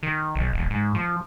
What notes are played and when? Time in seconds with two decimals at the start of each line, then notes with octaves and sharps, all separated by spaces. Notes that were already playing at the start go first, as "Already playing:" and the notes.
0.03 D#3
0.35 B1
0.53 E1
0.70 G#2
0.95 F3